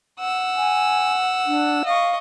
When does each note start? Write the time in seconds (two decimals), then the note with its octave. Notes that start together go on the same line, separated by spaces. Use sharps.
0.19 F#5 E6
0.56 G#5
1.47 D4
1.85 D#5 F5 C#6